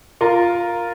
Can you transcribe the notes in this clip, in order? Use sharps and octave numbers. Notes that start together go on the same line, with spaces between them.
F4 A#4